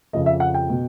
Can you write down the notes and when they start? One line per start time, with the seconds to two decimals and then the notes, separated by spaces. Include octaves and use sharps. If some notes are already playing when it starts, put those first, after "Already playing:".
0.13 F2 C#3 F3 D#5
0.26 E5
0.40 F#5
0.54 G5
0.70 B2